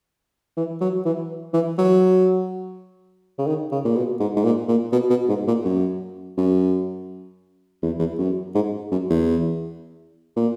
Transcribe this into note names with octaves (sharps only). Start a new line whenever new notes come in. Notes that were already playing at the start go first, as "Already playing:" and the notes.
E3
F#3
E3
E3
F#3
C#3
D#3
C#3
A#2
B2
G#2
G#2
A#2
A#2
B2
B2
G#2
A#2
F#2
F#2
E2
E2
F#2
G#2
F#2
E2
A#2